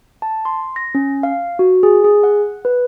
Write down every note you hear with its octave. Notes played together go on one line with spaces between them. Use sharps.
A5
C6
A#6
C#4
F5
F#4
G#4
G#4
F#5
B4